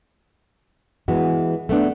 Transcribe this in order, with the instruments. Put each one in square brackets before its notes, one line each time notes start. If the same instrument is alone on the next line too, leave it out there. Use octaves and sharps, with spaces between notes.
[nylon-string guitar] E3 G#3 B3 F#4
A3 B3 D4